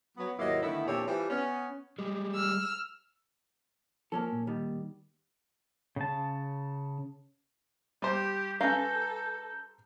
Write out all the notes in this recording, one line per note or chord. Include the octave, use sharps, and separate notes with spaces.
F#3 B3
D#2 G#2 F#3 A#3 E4 D#5
D3 D#3 A3 B3 E4
E2 A#2 C4 D4 G4 C#5
E3 F3 G3
B3 C#4
G3 G#3
E6 F6
F3 A#3 C#4 A4
A#2
D#3 G3
C#3 A5
G3 G4 C5
C#4 A4 B4 F5 A#5 G6